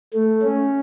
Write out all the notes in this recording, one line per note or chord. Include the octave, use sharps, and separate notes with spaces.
A3
C#4